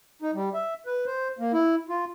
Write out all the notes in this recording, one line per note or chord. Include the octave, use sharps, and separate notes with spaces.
D#4
G3
E5
B4
C5
A#3
E4
F4